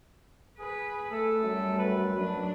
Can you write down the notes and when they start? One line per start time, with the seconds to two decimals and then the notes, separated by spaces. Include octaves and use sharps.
0.59 G#4 B4
1.11 A3 A4
1.42 F#2 G3 A3
1.78 B4
2.15 F#2 F#3 D4